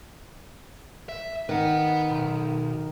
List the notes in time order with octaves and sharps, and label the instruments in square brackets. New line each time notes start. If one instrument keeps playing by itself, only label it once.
[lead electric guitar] E5
[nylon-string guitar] D#3 [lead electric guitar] B4 F#5
[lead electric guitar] B1